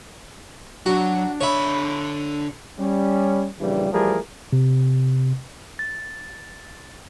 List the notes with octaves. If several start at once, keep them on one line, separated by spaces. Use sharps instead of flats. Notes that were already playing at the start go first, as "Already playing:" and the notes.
F#3 D4 F#4
D3 C#5 E5 B5
G3 C#4
A#1 G2 C#3 E3 G3
E3 F3 G3 A3 G#4 A#4
C3
A6